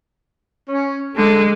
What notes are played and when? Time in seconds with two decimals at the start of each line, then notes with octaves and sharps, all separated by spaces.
0.69 C#4
1.15 D3 G#3 A4